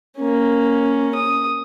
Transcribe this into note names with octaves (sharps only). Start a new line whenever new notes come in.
A#3 C#4
D#6